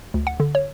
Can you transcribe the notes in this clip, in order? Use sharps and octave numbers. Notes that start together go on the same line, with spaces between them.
D2
F#5
D3
C#5